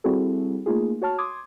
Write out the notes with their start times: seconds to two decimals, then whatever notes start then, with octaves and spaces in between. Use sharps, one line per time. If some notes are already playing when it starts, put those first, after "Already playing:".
0.04 G3 C4 E4 F#4 G#4 A4
0.66 A3 A#3 D#4 F4 G#4
1.02 F#4 C#5 A5 F6
1.18 C6 D6 D#6 G#6